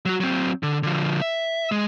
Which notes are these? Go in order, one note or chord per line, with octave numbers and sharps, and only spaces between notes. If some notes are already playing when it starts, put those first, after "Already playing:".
F#3 F#4
F#3 C4
D3
D3 F3
E5
G#3